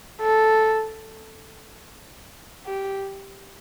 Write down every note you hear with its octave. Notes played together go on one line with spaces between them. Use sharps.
A4
G4